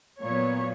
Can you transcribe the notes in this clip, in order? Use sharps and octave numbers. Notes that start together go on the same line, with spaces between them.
A#2 F#3 B3 C#5